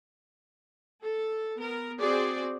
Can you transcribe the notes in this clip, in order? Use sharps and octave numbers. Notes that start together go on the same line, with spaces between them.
A4
B3 A#4
C4 F#4 G#4 C5 D5